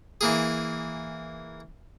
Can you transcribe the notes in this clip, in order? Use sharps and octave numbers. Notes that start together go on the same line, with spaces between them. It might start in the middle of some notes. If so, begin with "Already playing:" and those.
E3 A#3 G#4